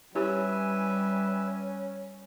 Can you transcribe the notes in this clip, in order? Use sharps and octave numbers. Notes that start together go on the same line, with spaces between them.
G3 C#4 E4 G4 B4 C#5 E5 G#5